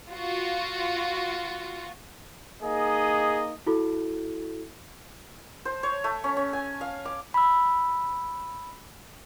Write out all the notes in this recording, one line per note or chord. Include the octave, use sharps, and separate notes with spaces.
F4 F#4
A#3 D#4 G#4 D#5
E4 F#4 A4
C5
C#5
A3
C#4
C#4
G#5
F5
D6
B5 E6